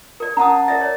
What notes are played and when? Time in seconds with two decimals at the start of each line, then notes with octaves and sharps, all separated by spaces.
0.20 A#4 D5
0.37 C#4 F#5 A5 A#5 D#6
0.68 A#4 D5 E5 A6
0.81 C#5